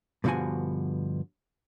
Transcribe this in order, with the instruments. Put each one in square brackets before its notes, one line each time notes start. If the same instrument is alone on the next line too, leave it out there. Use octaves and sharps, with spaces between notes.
[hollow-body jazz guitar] G2 B2 D3 F3 F#4 G#5